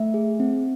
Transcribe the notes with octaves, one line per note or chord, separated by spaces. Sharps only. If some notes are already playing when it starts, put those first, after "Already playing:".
Already playing: A3 E5
G#4
C4